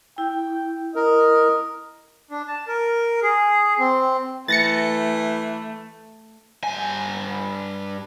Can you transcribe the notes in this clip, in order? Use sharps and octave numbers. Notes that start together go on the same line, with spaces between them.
E4 G5
A#4 D#5
D4
A5
A#4
G#4
C4
E3 A3 A6 A#6 C#7
G2 G#5